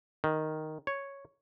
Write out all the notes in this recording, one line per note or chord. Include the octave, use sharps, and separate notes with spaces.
D#3
C#5